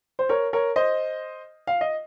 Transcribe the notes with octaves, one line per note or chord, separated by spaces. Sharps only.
C5
A#4 C#5
A#4 C#5
C5 D#5
F5
D#5